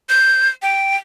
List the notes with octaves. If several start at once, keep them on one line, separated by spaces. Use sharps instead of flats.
G6
G5